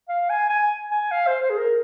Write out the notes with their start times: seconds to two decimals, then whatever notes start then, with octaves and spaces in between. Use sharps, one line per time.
0.09 F5
0.29 G#5
0.50 G#5
0.91 G#5
1.11 F5
1.27 C5
1.42 C5
1.50 G#4
1.58 A#4